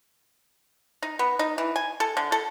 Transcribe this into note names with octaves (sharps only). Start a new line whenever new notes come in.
D#4
B3
D#4
E3
G#5
A4
D3
A4